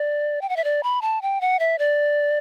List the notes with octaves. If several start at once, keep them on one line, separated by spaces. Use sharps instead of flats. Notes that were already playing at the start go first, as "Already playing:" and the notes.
Already playing: D5
G5
F#5
E5
D5
B5
A5
G5
F#5
E5
D5